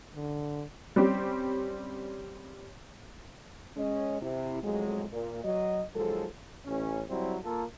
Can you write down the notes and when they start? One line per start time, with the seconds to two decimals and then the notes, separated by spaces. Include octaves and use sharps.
0.15 D3
0.96 G3 C4 C#4 G4
3.77 G#3 C#4 D#5
4.22 C3 E4
4.63 F2 A2 F#3 G#3
5.12 A#2
5.44 F#3 D#5
5.95 D#2 F3 F#3 G#3 A4
6.66 A1 C#4
7.09 F#3 G3 C4 E4
7.44 A#3 F4 A4